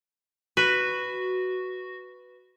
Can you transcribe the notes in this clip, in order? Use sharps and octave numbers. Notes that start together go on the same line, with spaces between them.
F#4 B4